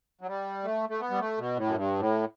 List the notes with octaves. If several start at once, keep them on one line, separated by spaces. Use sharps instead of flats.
F#3
G3
A3
A3
B3
G3
A3
B2
A2
F#2
G2
A2